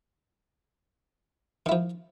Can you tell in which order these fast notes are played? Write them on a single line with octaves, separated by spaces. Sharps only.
D#3 E4 F3